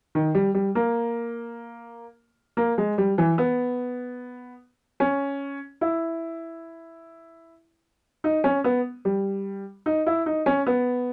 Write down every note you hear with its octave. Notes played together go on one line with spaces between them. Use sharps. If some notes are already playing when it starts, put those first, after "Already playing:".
D#3
G3
G3
A#3
A#3
G#3
G3
E3
B3
C#4
E4
D#4
C#4
B3
G3
D#4
E4
D#4
C#4
B3